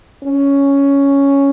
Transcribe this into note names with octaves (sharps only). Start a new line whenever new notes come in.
C#4